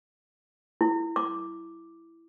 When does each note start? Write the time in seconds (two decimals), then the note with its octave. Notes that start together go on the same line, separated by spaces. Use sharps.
0.81 E4
1.16 D6